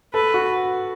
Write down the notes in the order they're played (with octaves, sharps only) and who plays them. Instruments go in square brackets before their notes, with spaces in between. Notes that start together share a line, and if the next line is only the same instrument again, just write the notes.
[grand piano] A4 [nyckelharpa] B4
[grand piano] F#4